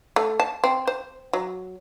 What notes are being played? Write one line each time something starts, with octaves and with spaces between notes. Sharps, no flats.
A3
A5
C4
C5
F#3